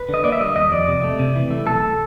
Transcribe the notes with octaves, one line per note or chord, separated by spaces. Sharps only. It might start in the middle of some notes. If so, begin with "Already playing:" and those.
Already playing: B4
D3
D#5
A#3 D5
E5
G3 D#5
D#2 D#5
F2 D5
C3
A3
C3
E3
A3
B1 A4